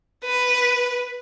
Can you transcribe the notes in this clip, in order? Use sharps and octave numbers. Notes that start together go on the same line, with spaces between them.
B4